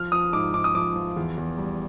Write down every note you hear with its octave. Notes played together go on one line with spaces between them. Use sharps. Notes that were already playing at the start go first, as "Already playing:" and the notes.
Already playing: F3 F6
F3 D#6
G#2 D6
G#2 D6
D#6
F3 D6
F3
E2
E2
G3